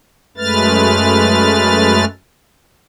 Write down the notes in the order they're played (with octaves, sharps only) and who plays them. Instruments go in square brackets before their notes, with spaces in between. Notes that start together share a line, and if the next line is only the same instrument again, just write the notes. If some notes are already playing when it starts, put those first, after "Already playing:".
[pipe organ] F#2 G#3 A3 B4 F6 A6